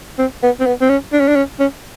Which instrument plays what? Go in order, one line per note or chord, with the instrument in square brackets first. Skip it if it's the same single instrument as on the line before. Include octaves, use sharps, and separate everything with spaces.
[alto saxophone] C4
B3
C4
B3
C4
C#4
D4
C#4
D4
C#4
C#4